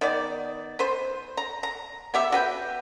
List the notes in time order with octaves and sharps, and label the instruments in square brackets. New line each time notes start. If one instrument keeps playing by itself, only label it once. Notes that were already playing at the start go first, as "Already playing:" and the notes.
[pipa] D#3 B3 D5
B4 C5
A#5
A#5
B3 G4 E5
F#4 B4 G5